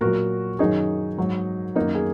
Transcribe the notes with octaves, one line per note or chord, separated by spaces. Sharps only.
A#2 F#3 F#4 A#4
F#2 D#3 F#3 D#4 G#4
G#2 F#3
F#2 D#3 F#3 A#3 D#4
G#4